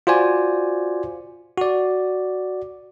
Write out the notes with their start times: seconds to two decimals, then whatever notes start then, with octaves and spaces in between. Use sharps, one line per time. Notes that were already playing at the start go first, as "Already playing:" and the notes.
0.07 F4 F#4 C5 D5 G#5
1.58 F#4 D5